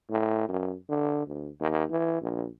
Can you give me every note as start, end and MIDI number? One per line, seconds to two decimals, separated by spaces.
0.11 0.48 45
0.49 0.74 42
0.89 1.24 50
1.27 1.50 38
1.60 1.85 39
1.90 2.20 52
2.22 2.47 34